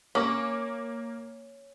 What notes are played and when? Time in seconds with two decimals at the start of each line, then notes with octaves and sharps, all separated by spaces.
0.15 A#3 C#4 D6 F#7